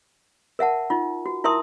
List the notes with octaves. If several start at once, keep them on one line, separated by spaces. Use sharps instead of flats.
A#4 E5 F#5 A5
D#4 F4
F#4
E4 A#4 E5 A5 C6 D#6